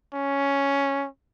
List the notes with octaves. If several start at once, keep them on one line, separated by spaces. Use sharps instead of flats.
C#4